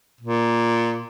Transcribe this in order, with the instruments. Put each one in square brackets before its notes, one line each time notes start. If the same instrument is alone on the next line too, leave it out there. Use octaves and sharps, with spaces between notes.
[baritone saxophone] A#2